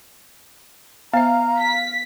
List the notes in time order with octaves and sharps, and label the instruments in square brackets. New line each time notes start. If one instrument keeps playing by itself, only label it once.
[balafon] B3 C5 E5 [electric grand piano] F5 [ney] A#5
[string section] B6